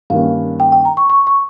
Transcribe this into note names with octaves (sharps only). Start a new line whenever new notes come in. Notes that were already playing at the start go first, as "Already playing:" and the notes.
G2 D#3 A#3 C#4 F5
G5
G5
A#5
C#6
C#6
C#6